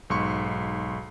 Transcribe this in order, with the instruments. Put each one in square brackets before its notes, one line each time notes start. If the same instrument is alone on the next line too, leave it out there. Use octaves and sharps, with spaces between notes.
[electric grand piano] B1 G#2 C6 C#6 C#7